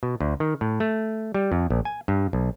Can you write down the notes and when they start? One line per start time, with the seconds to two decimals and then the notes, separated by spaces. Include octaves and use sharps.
0.03 B2
0.21 D2
0.40 D#3
0.61 A2
0.80 A3
1.34 G3
1.52 F2
1.70 A#1
1.85 G#5
2.08 G2
2.33 B1